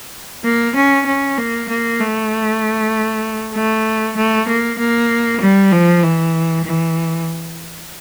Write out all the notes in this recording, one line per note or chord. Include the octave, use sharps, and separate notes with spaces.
A#3
C#4
C#4
A#3
A#3
A3
A3
A3
A#3
A#3
G3
F3
E3
E3